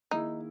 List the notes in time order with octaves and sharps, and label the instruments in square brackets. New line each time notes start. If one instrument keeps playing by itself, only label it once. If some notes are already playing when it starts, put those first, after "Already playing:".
[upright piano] D#3 A#3 E4 G#4 [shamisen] D#4